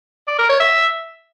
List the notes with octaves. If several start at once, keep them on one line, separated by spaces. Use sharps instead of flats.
D5
A#4
C#5
E5